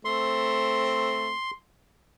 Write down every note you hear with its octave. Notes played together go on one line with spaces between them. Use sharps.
A3 C4 C6